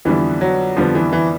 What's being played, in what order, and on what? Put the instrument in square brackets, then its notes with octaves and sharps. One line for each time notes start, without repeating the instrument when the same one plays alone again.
[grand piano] F2 D3 G3 B3 [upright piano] E3
[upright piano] F#3
[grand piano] F2 D3 G3 B3 [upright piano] F3
[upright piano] E3
E3